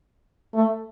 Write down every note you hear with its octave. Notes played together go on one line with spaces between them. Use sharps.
A3